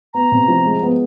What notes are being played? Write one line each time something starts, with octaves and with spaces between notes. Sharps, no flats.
B3 A#5
C3
F3
G#3
B3